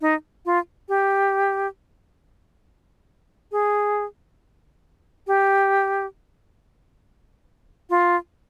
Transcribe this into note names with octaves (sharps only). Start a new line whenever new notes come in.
D#4
F4
G4
G#4
G4
F4